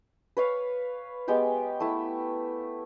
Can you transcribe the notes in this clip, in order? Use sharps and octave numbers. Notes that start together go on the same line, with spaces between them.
B4 C#5 F5
G#3 B3 G4 G5
A3 E4